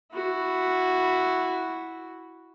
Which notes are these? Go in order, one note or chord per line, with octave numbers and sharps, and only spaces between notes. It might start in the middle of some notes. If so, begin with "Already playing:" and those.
E4 F#4